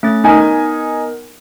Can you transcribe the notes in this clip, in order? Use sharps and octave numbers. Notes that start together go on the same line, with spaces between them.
A3 C#4 A6
B3 D#4 A#4 G#5